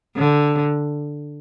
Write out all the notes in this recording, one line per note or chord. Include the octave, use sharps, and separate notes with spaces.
D3